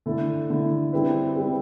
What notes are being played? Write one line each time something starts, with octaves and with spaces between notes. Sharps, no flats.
D3 A3 E4 A4
D3 A3 E4 A4
G3 C4 E4 B4
G3 C4 E4 B4